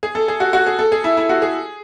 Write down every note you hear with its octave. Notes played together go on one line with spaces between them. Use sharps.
G#4
A4
G#4
F#4
F#4
G#4
A4
G#4
E4
E4
F#4
G#4